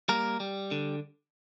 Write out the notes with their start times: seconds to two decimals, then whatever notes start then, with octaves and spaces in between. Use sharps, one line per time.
0.09 G3 A#3 A#4
0.40 G3
0.71 D3